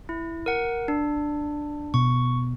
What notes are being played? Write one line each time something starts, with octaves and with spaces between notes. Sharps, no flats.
E4
A#4 F#5
D4
B2 C#6